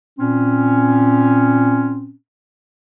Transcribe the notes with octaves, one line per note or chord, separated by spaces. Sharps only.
A#2 C4 C#4